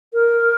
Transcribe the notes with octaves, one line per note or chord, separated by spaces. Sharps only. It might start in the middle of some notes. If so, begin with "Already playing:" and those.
A#4